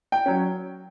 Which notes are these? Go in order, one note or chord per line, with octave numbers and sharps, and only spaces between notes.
G5
F#3 C#4